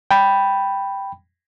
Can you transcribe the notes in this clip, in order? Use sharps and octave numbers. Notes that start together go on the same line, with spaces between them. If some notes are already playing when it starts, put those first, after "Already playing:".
G5 B5